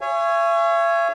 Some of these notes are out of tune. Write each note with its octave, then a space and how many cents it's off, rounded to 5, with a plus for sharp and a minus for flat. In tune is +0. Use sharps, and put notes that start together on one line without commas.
C#5 +0 E5 +45 G#5 +0